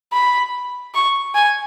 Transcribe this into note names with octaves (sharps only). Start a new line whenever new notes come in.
B5
C#6
G#5